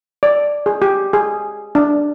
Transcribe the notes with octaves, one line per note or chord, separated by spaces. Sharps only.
D5
G#4
G4
G#4
D4